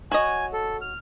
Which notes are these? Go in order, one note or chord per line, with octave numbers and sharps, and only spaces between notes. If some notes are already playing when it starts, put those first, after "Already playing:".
F#4 C#5 D#5 G#5
A4
F6